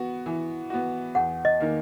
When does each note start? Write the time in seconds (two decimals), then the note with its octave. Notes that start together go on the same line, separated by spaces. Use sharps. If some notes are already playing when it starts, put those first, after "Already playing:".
Already playing: B3 F#4
0.26 E3
0.70 B3 F#4
1.15 E2 F#5
1.45 D#5
1.60 D#3 A#3